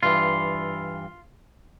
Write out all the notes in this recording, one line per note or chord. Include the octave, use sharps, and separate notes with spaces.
G2 E3 F4